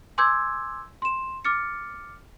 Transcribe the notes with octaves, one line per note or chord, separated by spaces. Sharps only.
G#5 C6 D6 E6 G6 G#6
C6 E7
D6 F6 A6 C#7